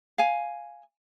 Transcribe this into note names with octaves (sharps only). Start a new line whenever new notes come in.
F5 G#5